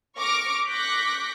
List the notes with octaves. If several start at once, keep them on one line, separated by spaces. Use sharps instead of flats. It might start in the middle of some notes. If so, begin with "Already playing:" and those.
C#6 D6 F6 A#6 D7
C#6 D6 F#6 G6 A#6 B6